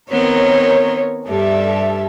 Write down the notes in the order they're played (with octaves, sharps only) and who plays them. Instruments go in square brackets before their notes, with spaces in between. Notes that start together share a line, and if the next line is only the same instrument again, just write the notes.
[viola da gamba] D#3 B3 C4 [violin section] A#4 C#5
[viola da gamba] G2 G3 [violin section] A4 E5